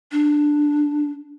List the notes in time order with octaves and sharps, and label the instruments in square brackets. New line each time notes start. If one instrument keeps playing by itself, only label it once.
[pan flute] D4